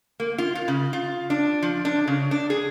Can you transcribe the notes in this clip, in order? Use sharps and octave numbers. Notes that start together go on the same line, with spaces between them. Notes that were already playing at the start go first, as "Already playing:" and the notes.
A#3
F4
F4
C#3
F4
D4
F3
D4
C#3
D4
G#4